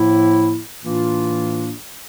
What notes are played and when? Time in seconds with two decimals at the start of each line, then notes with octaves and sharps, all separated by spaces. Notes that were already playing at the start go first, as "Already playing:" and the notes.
Already playing: A2 F3 A#3 E4
0.82 A2 E3 A#3 D4 F4